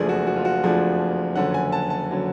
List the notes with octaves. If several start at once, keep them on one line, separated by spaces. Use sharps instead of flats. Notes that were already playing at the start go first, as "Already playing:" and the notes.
Already playing: F#1 F2 F3 A3 D4 G#4
F#4
F#4
F4
F#4
F#1 F2 F3 A3 D4 G#4
F#1 F2 D3 F#3 C#4 F#5
G#5
A5
A5
D3 F#3 C#4